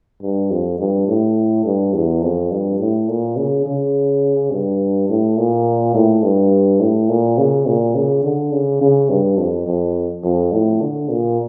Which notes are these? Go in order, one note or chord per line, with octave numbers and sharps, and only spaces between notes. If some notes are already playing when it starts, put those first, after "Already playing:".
G2
F2
G2
A2
G2
E2
F2
G2
A2
A#2
C#3
C#3
G2
A2
A#2
A2
G2
A2
A#2
C#3
A#2
C#3
D3
C#3
C#3
G2
F2
F2
F2
A2
D3
A#2